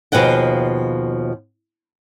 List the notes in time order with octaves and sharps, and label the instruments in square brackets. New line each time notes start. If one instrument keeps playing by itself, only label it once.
[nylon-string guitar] D#2 B2 F3 G#4 F#5 G5